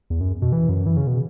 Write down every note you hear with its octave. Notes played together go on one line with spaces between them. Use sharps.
E2
F#2
B2
E3
F#2
E3
C#3
B2